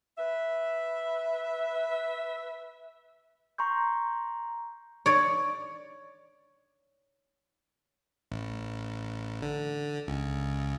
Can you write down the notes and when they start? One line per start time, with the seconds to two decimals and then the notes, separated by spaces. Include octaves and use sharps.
0.17 B4 E5
3.58 A#5 C6 C#6 G6
5.06 C#5 D5
8.32 A1
9.42 D3
10.07 C#2